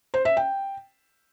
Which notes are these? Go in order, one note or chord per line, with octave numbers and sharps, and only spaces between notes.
C5
E5
G5